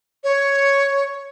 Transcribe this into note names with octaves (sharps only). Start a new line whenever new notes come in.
C#5